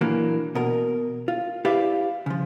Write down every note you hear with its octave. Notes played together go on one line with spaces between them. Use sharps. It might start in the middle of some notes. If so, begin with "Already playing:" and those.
A#2 E3 F#3 A#3 D4
B2 A#4
F4
E4 G4 B4 D5 E5 F5
C#3 F3